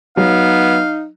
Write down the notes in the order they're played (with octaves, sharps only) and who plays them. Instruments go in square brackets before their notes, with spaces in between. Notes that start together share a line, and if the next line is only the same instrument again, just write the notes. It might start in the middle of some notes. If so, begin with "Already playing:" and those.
[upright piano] F#3 [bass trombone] B3 [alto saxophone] D#4 [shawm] F5